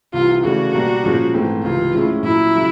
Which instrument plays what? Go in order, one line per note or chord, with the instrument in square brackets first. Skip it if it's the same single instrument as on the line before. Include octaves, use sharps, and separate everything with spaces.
[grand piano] C2 C3 E3 [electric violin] F4
[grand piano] C#3 E3 A3 D4 [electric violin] F#4
[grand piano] B2 G3 A#3 D4
A#2 F3 G#3 C#4
G#2 E3 A3 C4
[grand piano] C#2 C3 E3 [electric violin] F4
[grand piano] A2 F3 G#3 C#4 E4
[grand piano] A#2 F#3 A#3 [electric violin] E4
[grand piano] C#3 F#3